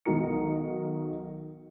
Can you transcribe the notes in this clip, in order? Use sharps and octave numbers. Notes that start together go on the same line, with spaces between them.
B1 D#3 D#4 F#4 A#4 C#7